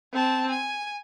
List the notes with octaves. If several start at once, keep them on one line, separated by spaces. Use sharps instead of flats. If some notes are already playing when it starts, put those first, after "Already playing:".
C4 A5
G#5